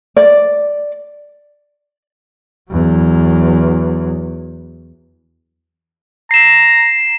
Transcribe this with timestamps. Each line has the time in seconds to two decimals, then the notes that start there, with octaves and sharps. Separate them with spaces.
0.16 D5
2.71 E2 F#3
6.31 A#5 C7 E7